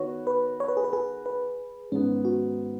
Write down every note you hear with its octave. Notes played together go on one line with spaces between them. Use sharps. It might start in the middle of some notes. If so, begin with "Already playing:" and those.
Already playing: D#3 B3 F#4 B4 C#5
B4
C#5
B4
G#4
B4
G#4
B4
G#2 D#3 B3 C#4
F#4